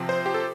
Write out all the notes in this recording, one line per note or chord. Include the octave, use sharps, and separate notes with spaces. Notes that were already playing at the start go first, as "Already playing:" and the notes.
Already playing: C3 F3 C4
C5
G4
A4